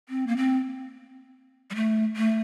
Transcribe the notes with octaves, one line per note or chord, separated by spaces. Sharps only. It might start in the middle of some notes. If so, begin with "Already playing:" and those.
C4
A#3
C4
G3
A3
A3